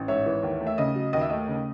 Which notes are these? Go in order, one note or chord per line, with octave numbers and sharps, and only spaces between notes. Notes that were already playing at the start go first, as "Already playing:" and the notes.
Already playing: A1
G#2 C#5 E5
E3
D#2
A3
E5
C#3 D#5
F#3
D#2 D#5
E5
A3 D#5
C#3